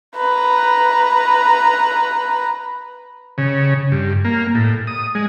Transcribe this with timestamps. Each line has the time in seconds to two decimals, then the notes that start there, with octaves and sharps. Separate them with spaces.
0.17 B4 A#5
3.38 C#3
3.92 G2
4.25 A#3
4.55 A2
4.87 D#6
5.15 G#3